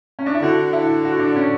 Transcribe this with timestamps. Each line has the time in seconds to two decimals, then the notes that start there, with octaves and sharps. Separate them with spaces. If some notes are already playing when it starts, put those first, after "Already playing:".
0.19 C#4
0.26 D4
0.34 E4
0.42 D3 F#4
0.73 E4
1.05 F#4
1.19 D4
1.36 C#4